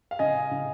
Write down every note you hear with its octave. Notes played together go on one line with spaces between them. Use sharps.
F5
C#3 D#5 G#5
C#3